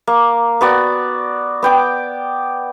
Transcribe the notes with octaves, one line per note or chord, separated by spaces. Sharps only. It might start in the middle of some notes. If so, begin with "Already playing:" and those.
A#3
B3 F#4 D5
B3 G5 D6